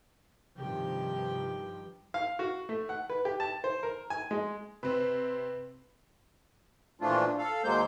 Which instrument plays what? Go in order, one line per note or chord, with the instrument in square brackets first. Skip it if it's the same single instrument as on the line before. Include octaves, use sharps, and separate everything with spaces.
[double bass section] G2 D#3 F3 [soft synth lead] C3 [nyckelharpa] G4 G5
[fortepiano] F5
F#4
A3
F#5
B4
G4
A5
C5
A#4
G#5
G#3
[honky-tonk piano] C3 C4 [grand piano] B4
[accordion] A#2 E3 F3 A3 D4 F4
A4 F5
D#2 F#3 G#3 A#3 C5 G6